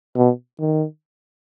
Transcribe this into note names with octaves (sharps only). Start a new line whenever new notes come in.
B2
D#3